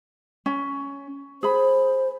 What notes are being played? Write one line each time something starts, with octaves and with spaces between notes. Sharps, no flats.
C#4
G#4 C5 B5